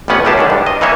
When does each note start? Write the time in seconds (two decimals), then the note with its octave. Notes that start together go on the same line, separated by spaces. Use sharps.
0.08 A1 F2 G3 B3 C#4 F#5
0.25 C#2 F#2 A2 G4 G#4 A5
0.38 D3 D#3 D4
0.50 G2
0.66 D#5
0.81 E3 A#3 D#4 C#5 E5